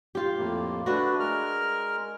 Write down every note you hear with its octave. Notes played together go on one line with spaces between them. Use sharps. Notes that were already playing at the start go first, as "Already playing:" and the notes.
F4 G4
F2 A2 A#3
A3 D4 F#4 B4
G#3 A#4 F6